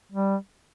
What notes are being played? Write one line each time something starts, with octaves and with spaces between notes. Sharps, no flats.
G3